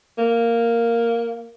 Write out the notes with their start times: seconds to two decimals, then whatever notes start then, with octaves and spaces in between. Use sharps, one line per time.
0.18 A#3